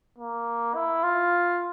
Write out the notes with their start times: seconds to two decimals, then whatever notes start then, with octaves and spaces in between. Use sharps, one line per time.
0.18 A#3
0.75 E4
1.03 F4